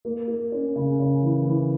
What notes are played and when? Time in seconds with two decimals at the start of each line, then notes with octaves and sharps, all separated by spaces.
0.05 A#3
0.28 A#3
0.52 C#4
0.76 C#3
1.00 C#3
1.22 E3
1.46 E3